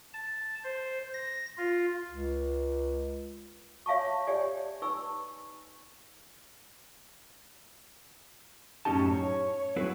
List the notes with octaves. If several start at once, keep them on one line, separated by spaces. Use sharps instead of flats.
A5
C5
A#6
F4
C#2
C#5 E5 F5 G#5 A5 C#6
G4 C#5 D5 G#5
D#4 B4 G#5 C#6 E6
F#2 A2 C#4 D#4 G4 A5
C#5
F#3 C4 E4 F#4 G#4 B4